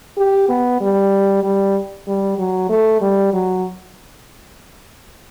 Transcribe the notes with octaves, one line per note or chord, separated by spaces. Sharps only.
G4
B3
G3
G3
G3
F#3
A3
G3
F#3